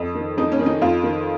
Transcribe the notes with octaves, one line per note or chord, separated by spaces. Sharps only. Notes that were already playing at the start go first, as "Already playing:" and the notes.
Already playing: F2
D#3
F2 D#4
C#4
D#3
D#4
F2 F4
D#3